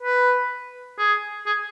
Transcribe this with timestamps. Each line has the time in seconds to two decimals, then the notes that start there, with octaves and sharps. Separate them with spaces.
0.03 B4
0.98 G#4
1.46 G#4